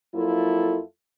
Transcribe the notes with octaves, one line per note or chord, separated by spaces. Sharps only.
F2 F#3 A#3 E4 F4 A4